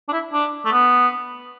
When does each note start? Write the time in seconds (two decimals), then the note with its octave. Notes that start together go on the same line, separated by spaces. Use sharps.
0.09 D4
0.13 E4
0.33 D4
0.65 A3
0.72 B3